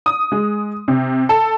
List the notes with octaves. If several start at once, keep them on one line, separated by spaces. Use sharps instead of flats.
D#6
G#3
C3
A4